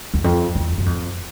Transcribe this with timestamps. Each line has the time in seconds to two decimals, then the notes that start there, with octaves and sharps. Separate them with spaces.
0.14 E2
0.24 F2
0.55 E2
0.78 F#2
0.86 F2